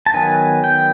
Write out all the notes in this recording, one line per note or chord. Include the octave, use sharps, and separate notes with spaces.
A5
D#3 F#3 B3 G#5
G5